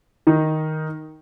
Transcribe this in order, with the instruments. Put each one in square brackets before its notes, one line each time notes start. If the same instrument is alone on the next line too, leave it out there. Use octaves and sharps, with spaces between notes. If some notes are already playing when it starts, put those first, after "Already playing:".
[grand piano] D#3 D#4